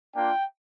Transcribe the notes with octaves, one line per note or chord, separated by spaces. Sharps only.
A#3 D4 F4 G5